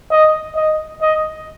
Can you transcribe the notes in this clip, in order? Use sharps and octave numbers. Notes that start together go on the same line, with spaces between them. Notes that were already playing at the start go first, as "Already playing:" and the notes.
D#5
D#5
D#5